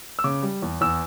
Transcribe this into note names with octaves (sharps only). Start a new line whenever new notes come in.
E6
C#3 D6
G3
E2
E2 E6